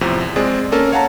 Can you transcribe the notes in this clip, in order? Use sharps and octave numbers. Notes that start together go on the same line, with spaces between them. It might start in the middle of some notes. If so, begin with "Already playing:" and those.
E2 A2 C3 F3
E2
G#3 C4 G#4 D5
A#3 C#4 A4 A#4
C#5 F5 F#5 A5 A#5